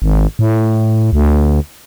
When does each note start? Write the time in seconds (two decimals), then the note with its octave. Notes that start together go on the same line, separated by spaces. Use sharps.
0.02 G#1
0.39 A2
1.13 D2